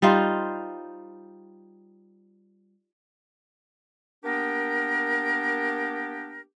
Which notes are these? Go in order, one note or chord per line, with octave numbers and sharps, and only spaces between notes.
G3 D#4 F4 C5
A#3 B3 D4 G4 A#4